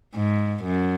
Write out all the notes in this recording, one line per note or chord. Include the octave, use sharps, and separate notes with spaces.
G#2
F#2